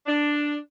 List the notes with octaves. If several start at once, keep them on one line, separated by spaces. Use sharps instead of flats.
D4